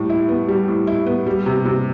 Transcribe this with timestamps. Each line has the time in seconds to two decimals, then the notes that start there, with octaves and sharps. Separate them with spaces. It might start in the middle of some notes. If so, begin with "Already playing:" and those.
Already playing: A2 G3
0.10 E4
0.28 B3
0.48 G3
0.68 A2
0.87 E4
1.06 B3
1.26 G3
1.46 C3
1.65 C3